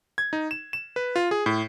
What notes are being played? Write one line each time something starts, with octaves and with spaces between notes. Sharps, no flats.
G#6
D#4
E7
E7
B4
F4
G#4
A2